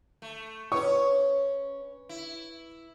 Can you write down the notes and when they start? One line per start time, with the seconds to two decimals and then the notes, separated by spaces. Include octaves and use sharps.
0.22 A3
0.72 C#4 B4 C#5 C#6
2.09 E4